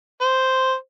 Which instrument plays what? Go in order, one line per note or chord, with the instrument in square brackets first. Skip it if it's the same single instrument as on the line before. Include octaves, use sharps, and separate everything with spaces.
[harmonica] C5